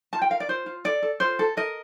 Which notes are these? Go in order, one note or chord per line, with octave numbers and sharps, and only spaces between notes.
F4 A5
G5
A#4 F5
D5
F4 C5
F4
A4 D5
A4
F4 C5
A4
A#4 D#5